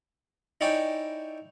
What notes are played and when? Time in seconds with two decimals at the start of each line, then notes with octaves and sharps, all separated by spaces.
0.61 D#4 E4 C#5 D5 G5 G#5